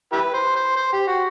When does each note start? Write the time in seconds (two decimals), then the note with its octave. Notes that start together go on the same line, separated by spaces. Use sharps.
0.12 E4 G4 B4
0.34 C5
0.56 C5
0.76 C5
0.93 G4
1.07 F#4